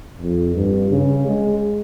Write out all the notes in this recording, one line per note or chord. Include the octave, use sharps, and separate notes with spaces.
F2
G2
C#3
G#3